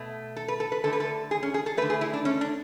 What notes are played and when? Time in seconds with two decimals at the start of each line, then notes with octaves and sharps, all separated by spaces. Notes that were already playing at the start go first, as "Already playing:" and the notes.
Already playing: B2 A3
0.36 A4
0.48 B4
0.60 A4
0.72 B4
0.84 D3 A3 A4
0.93 B4
1.00 A4
1.31 G#4
1.43 C#4
1.54 G#4
1.66 A4
1.77 A3 B4
1.82 D3
1.90 G#4
2.01 E4
2.13 D4
2.25 C#4
2.41 D4